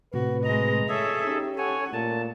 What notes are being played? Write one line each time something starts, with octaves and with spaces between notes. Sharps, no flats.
A2 C3 F#4 B4
G#3 D#5 A#5
G#4 A4 C#5 E5
C#4 D#4 G4
A4 C#5 F#5 G#5
A#2 A3 A5